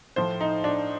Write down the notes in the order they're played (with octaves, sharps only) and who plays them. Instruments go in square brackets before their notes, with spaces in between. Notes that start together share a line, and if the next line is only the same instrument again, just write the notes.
[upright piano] A2 F3 C5
D#4
D4